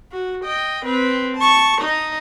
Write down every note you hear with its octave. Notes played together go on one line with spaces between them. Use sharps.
F#4
D#5 G5
C4 B4
A5 C#6
D#4 D#5